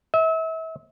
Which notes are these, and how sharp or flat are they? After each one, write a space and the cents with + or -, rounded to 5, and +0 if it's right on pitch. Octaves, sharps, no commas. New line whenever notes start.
E5 -35